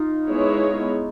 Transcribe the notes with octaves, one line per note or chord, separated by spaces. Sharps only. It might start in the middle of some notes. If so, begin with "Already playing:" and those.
Already playing: D#4 F4
G#3 B3 E4 G#4 C#5